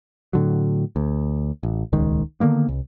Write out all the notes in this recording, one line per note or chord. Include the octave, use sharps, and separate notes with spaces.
A2 D3 F#3
D2
A1
D#1 C#2 D#3 G#3
D3 D#3 A#3 B3
C2